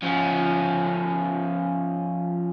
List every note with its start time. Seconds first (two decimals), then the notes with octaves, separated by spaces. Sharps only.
0.03 F3 C#4